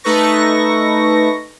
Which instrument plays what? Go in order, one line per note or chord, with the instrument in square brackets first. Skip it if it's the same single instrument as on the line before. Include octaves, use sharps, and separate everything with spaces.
[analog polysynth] A3 D#4 A4 B4 C#6 A#6